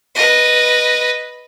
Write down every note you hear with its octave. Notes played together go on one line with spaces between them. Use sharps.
B4 D#5